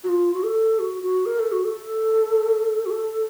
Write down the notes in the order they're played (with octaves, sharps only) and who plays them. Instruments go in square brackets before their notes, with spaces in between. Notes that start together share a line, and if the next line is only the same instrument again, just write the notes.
[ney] F#4
F4
F#4
A4
F#4
F#4
A#4
A4
F#4
A4
F#4
A4